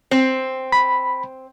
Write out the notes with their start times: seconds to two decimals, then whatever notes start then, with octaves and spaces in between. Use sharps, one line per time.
0.11 C4
0.72 B5